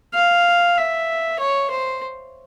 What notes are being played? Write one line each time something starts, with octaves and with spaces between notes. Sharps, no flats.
F5
E5
C#5
C5